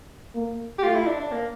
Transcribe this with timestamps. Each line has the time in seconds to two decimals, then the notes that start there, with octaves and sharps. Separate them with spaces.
0.35 A#3
0.79 G4
0.83 A3 F4
0.95 E4
1.07 D4
1.20 D4
1.32 A#3